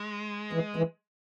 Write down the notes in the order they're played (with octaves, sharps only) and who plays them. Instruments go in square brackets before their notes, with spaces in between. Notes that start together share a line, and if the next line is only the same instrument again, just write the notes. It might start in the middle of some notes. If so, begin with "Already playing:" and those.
Already playing: [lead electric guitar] G#3
[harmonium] E3
E3